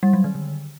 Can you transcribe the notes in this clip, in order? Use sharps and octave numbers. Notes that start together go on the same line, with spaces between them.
G3
F#3
D#3
D3